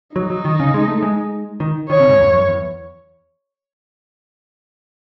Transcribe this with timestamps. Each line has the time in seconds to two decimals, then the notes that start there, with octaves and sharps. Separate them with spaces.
0.16 F#3 D#4
0.30 F#3
0.45 D#3
0.60 C#3
0.74 G#3
0.88 A3
1.02 G#3
1.60 D#3
1.89 D#3 C#5
2.00 C3
2.09 G#2
2.18 E2
2.33 F#2
2.48 E2